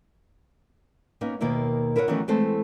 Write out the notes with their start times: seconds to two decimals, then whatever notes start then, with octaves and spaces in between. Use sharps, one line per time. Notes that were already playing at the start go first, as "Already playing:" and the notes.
1.21 A#3 B3 C#4 D#4
1.41 D#2 B2 D#3 A#3 A#4 E5
1.96 E4 A#4 B4 C#5 E5 F#5
2.08 D#3 E3 F#3 A3 B3 C#4
2.28 E3 G#3 A3 C4 A4 C5